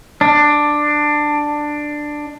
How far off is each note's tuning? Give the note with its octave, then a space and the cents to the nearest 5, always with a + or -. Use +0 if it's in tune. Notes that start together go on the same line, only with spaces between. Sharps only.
D4 +10